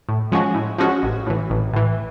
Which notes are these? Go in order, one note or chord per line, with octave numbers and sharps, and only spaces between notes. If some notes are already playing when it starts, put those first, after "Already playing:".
A2
F3 G#3 C#4 F#4
A2
F3 G#3 C#4 F#4
A1
A2 E3
A1
A2 E3